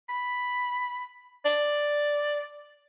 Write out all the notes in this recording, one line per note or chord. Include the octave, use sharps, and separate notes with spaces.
B5
D5